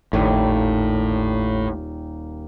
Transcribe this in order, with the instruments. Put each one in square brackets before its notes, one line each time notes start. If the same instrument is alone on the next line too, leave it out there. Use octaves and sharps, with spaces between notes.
[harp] D#1 D#2 [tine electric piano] G#1 [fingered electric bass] A2